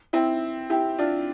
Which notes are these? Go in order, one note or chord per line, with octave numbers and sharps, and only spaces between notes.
C4 E4
E4 G4
D4 F4